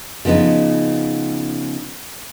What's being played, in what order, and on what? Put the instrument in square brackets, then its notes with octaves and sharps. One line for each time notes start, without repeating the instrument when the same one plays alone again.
[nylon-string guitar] C#3 F3 B3 D#4 B4